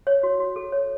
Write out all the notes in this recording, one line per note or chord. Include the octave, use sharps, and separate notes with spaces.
C#5
F#4
F#4
A4
C#5